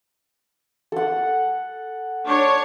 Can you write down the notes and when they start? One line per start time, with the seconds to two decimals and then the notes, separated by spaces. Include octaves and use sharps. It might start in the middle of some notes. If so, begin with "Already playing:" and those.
0.92 A4 F#5
2.23 D4 C#5